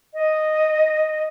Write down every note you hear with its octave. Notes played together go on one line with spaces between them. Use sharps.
D#5